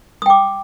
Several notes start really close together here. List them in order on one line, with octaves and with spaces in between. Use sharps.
D#6 G5 D6